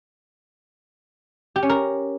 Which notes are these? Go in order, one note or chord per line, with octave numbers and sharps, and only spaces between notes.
G4
C#4
A#4